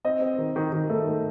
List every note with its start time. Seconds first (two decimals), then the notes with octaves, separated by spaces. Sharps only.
0.05 C4 D#5
0.21 C4
0.38 D#3
0.56 D#3
0.72 D#3
0.90 A3
1.07 A3